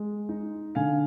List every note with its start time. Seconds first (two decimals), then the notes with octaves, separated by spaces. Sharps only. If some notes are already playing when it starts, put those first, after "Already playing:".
Already playing: G#3
0.29 D#4
0.75 D3 F5 G#5